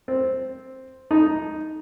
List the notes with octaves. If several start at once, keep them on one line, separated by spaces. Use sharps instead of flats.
C4
D#4